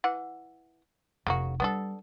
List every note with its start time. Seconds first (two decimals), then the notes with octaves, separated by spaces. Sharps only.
0.04 E3 F#5
1.27 F1 C#3 A#3 F#4
1.60 G3 B3 D4 A4